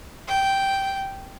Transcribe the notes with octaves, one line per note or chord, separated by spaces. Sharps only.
G5